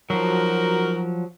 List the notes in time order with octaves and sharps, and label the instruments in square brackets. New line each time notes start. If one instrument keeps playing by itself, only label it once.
[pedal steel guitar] F3 F#3 [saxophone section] D#4 F#4 A#4